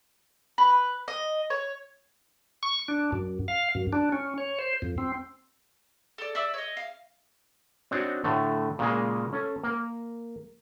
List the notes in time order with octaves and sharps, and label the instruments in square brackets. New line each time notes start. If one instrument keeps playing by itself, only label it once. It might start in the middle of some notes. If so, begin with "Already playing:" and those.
[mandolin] B4
D#5
C#5
[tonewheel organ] C#6
D4
F#2
F5
F#2
D4
C#4
C#5
C5
F2
C4
[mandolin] A4 D5
D5 E5 D6 E6
C#5 D#5
F5
[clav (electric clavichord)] C4 D4 D#4 F#4 C#5 F#5
A2 D3 A3
A#2 C#3 G#3 A#3
C#4 A4
A#3 A#4